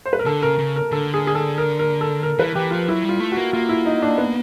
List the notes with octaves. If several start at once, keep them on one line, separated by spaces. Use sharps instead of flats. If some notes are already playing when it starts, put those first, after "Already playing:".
C5
B4
A#4
D3 A4
C#3 A#4
C#3
A#4
D3 A4
G#4
G#4
A4
A#4
A#4
A4
A#4
E3 B4
E3 G4
F3 F4
F#3 E4
G3
F4
A3
A#3 F#4
A#3 F4
E4
D#4
D4
B3